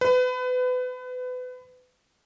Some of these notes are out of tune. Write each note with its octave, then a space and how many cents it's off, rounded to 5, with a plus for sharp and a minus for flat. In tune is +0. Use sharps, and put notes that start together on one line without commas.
B4 +30